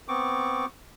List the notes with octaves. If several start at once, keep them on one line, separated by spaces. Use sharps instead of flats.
B3 C4 C#6 D6